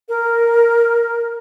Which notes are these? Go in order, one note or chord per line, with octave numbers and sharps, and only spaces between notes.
A#4